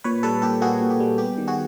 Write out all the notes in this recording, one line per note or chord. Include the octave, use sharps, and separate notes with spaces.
A#2 B4 C#5
G3 A4 B4
A#2 G4 A4
A#3 F#4 G#4
A#2
G4
G3
B3 G4
D#3
F#4 G#4